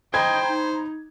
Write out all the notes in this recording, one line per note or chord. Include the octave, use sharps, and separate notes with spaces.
C5 D#5 G5 A#5 B5 G#6
D#4